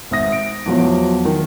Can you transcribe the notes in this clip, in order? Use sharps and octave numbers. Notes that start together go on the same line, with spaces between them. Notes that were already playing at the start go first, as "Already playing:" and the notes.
G#1 E5 D#6 A#6
D7
E2 F3 F#3
D#3